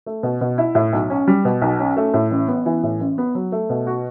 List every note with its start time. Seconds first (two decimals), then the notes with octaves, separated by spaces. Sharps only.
0.06 A3
0.23 B2
0.41 B2
0.58 E4
0.75 A2
0.93 B1
1.10 C#4
1.28 G3
1.45 B2
1.62 B1
1.79 C#4
1.97 A3
2.14 A2
2.31 A1
2.48 B3
2.66 E3
2.83 A2
3.00 A1
3.18 B3
3.35 F#3
3.52 A3
3.70 B2
3.87 F#4